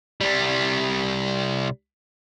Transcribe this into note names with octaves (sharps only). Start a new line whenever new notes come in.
C2 G3